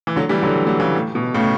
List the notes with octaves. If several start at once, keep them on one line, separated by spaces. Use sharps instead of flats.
E3
D3 F#3
E3 G3
D3 F#3
E3
F#3
C#3 E3
A2
B2
A2 C#3